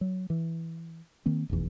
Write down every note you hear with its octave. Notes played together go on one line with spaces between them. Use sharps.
F#3
E3
D#3 A#3 C4
F1 B1 E2